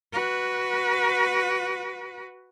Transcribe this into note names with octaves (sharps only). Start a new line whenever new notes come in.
F#4 B4